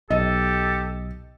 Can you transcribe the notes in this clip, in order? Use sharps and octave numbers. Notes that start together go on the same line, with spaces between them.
B1 G4 A4 D#5